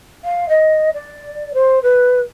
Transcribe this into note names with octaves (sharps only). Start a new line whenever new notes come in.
F5
D#5
D5
C5
B4